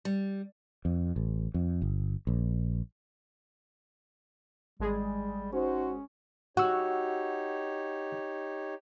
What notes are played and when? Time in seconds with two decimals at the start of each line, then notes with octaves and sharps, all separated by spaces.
0.05 G3
0.85 F2
1.16 A1
1.54 F2
1.82 G1
2.27 A#1
4.80 G#1 G3 G#3 G#4
5.52 C#4 D#4 F#4 C5
6.57 D#4 F#4 G4 C#5 F#5 E6